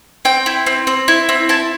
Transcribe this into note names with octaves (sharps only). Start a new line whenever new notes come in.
C4 G5
E4
C4
C4
E4
C4
E4 A5